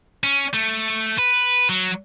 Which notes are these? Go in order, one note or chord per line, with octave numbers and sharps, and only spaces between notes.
C#4
A3
B4
F#3